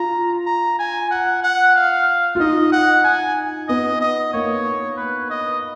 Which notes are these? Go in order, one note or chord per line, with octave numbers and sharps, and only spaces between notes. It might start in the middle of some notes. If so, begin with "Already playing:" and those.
Already playing: F4 A#5
A#5
G#5
F#5
F#5
F5
F4
D#4 D#5
F#5
G#5
B3 D#5
D#5
A#3 C#5
B4
D#5